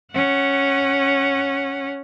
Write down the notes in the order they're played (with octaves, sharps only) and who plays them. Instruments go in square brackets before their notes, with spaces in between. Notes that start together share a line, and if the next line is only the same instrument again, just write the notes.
[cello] C#4 F#5